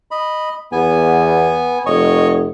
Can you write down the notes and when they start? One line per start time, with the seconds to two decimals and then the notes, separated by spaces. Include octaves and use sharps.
0.11 D#5 B5
0.72 E2 B3 G#5
1.86 F1 C#5 D#5 C#6